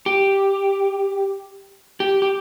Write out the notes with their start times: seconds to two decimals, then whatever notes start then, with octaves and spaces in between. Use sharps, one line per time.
0.06 G4
2.00 G4
2.22 G4